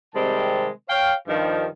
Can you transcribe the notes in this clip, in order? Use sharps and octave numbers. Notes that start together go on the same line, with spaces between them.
C3 D#3 G3 G#3 C4 A5
C#5 F5 G5
G2 D#3 F3